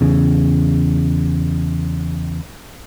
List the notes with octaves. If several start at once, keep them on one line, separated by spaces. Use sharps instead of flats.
E2 C#3